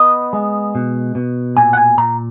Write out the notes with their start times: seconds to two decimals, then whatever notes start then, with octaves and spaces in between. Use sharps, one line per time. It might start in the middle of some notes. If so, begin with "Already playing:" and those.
Already playing: B3 D#5
0.33 G#3
0.75 B2
1.15 B2
1.57 A#2 G#5
1.73 F#5
1.77 G#5
1.98 A#2 A#5